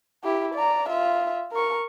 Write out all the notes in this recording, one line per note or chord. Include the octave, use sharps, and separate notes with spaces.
E4 G4
D5 A#5
F4 E5
A#4 C#6